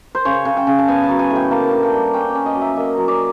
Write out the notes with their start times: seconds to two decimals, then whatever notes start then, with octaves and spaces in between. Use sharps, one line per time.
0.15 C5
0.25 C#3 C#5
0.45 C#3
0.57 G5
0.67 C#3
0.79 A5
0.88 B3 G#5
1.04 A5
1.09 F#3
1.19 G#5
1.30 A2
1.36 G5
1.51 A#3 A5
1.71 D4
1.83 G5
1.93 G3
2.14 C#4 G5
2.30 D5
2.35 C#4
2.46 D#5
2.56 F#3
2.61 E5
2.76 A#3 D#5
2.97 F#3
3.08 D5